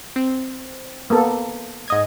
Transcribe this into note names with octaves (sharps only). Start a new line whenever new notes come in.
C4
A#3 B3 A4
G#2 D#5 G#6